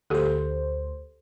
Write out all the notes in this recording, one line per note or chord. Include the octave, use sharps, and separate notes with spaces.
D2 G4 A4 C5